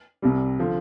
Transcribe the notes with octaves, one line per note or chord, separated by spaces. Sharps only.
C2 C3 G3
D3 F3